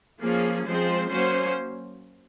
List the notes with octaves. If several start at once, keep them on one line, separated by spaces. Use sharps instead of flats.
F3 A#3 C#4 G#4
F3 G#3 C4 C5
F#3 A#3 C#4 C5